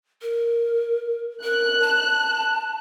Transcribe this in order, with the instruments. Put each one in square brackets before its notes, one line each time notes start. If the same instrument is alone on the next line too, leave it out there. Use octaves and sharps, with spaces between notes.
[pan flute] A#4
[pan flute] A#4 [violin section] F#6
[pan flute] A5